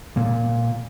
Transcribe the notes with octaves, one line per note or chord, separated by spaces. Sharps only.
A#2